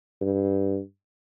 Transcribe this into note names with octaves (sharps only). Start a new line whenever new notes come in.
G2